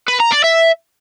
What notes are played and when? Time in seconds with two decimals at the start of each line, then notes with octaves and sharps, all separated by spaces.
0.08 B4
0.20 A#5
0.32 D5
0.44 E5